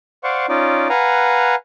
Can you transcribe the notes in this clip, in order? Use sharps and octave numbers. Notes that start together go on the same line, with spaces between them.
C5 D5 F5 F#5 C#6
C#4 D#4 F4 D5
B4 F5 F#5 G#5 A#5